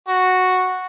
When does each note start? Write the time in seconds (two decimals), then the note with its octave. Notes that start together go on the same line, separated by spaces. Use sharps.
0.08 F#4